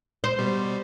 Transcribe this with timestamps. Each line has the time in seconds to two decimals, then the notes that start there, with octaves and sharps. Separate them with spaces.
0.24 C5
0.39 B2 G3